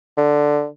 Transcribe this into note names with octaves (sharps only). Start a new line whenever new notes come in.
D3